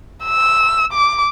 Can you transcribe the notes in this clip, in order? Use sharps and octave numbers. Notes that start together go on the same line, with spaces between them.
E6
D6